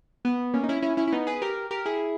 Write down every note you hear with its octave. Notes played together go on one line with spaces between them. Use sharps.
B3
A#3 C#4
D#4
C#4 E4
C#4 E4
C#4 E4
E4
B3 D#4
G#4 B4
G4 A#4
G4 A#4
E4 G#4